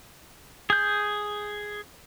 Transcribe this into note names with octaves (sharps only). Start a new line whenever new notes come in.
G#4 G6